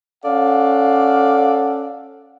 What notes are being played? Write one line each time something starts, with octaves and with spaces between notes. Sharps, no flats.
C#4 A4 D5 F5 F#5